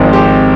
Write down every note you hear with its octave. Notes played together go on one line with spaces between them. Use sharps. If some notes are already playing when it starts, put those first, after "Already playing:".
Already playing: G#1 G#2 F3 C4
G4